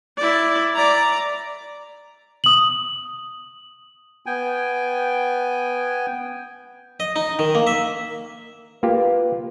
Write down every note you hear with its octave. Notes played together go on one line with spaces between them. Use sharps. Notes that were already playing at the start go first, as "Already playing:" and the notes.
E4 D5
D5 A#5
D#6 F#7
B3 G5 G#5
D#5
D#4
D#3
A#3
E5
A#3 F4 G4 B4